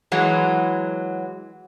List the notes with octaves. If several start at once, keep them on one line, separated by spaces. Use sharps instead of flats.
E3 F#3 G#3